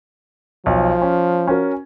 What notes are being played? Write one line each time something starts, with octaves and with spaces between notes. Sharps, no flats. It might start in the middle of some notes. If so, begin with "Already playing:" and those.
B1 F3
C#4
C#4 F#4 A#4